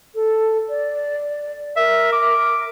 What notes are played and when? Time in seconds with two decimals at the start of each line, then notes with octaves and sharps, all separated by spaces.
0.14 A4
0.68 D5
1.76 A#4 E5
2.13 D6